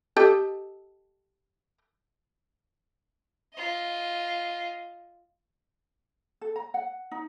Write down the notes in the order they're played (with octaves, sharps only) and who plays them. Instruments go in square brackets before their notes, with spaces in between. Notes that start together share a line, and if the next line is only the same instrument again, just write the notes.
[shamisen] G4 A4 D#5
[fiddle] F4 D#5
[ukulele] A4
A#5
F#5
D#4